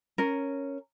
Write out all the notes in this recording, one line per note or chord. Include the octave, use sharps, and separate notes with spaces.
C#4 A#4